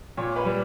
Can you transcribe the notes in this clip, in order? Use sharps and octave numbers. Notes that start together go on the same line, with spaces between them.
A#2 C#5
B4
G3